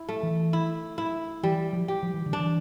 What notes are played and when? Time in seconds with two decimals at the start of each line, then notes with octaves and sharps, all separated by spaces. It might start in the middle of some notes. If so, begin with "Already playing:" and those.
Already playing: E4
0.09 A3
0.23 E3
0.53 E4
0.98 E4
1.43 E3 G3
1.73 F3
1.88 G4
2.03 F3
2.14 E3
2.26 D3
2.33 E3 D4